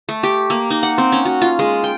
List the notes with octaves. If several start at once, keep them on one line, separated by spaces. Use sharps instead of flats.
A3
G4
A#3
D#4
F#5
C4
C#4
F#4
F4
G#3
G5